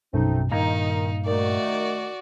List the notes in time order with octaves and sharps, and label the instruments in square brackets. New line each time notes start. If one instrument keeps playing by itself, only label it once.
[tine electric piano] A#1 F#2 B2 [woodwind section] A3 C4 D#4
[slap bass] G2 A#2 [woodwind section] D#3 [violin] D#4 [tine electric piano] F5 A#5
[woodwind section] D#3 A3 [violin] F#4 D5